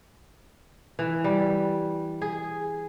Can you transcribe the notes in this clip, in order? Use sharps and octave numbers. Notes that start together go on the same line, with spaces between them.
E3
G3
G#4